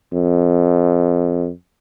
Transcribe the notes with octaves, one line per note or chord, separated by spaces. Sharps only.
F2